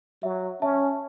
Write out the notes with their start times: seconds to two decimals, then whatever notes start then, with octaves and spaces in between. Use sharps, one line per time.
0.23 F#3 E5
0.62 C#4 E5 A5